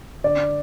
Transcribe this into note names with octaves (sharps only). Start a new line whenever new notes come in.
D3 D5